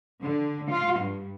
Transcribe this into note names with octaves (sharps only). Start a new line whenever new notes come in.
D3
F4
G2